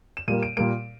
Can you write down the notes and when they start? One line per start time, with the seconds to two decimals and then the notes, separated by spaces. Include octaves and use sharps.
0.17 E7
0.28 A#2 G3 A#3 D#7
0.43 D7
0.57 A#2 G3 A#3 D7